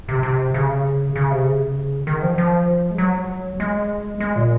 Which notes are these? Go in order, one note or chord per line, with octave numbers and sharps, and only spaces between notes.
C3
C3
C#3
C#3
C3
C#3
D#3
F3
F3
G#3
F#3
G#3
G#3
A#2